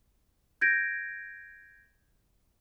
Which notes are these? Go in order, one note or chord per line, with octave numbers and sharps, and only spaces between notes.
G6 G#6 A#6 D7